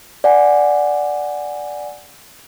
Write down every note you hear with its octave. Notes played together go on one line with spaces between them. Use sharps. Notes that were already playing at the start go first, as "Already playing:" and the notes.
D5 F#5 G#5